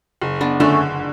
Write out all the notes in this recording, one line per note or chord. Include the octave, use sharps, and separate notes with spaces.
F#1
B3 D4
D3 A3 C#4